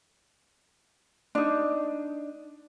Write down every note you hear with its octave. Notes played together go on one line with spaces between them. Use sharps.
D4 D#4